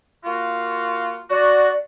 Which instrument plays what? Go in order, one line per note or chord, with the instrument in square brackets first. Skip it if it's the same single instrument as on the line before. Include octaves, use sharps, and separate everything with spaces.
[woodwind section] A#3 F4 F#4
[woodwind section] F#4 [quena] D5